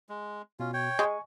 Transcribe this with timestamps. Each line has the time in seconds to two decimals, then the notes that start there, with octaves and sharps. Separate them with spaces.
0.09 G#3
0.60 B2 C#4 F4
0.73 C#5 G5
0.99 G#3 G#5 C#6